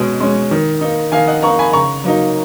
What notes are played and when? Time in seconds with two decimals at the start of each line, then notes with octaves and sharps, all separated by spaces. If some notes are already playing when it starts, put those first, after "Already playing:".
Already playing: B2 G#3 C#4
0.20 G#3 C#4
0.51 D#3
0.81 A#3 D#4
1.12 D#3 F5 G#5
1.27 D#5 F#5
1.43 A#3 D#4 A#5 C#6
1.59 G#5 B5
1.73 C#3 A#5 C#6
2.04 F#3 A#3 D#4